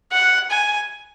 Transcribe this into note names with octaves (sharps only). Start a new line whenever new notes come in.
F#5
G#5